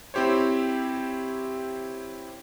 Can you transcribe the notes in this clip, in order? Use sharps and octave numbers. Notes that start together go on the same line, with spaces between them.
C4 E4 G4 C5 C#5